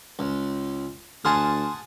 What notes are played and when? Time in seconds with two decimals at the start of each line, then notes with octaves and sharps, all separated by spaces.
0.19 C#2
1.25 D2 G#4 F#5 G#5 A5 C6 F6